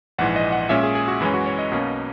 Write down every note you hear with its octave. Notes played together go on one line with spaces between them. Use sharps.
A#1 G#2 E3 F#5
D#5
F#5
A#2 G#3 C#4 E5
G#4
G#4
F#4
F#2 E3 G#3 C#4 E4
F#4
C#5
D#5
B1 B2 A#3 C#4